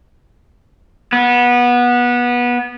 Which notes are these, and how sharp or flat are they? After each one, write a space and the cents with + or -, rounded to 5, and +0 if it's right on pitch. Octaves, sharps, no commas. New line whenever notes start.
B3 -20